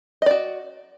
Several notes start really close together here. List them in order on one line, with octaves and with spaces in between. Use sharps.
D#5 D5 F#4